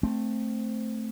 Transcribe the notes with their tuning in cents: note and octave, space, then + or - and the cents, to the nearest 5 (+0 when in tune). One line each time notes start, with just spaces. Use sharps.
A3 +0 C4 +0